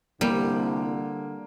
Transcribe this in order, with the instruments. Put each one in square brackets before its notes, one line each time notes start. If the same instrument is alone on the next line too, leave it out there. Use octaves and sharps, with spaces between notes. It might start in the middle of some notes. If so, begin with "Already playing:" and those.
[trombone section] C2 [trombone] D3 [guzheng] G3 [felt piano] A#3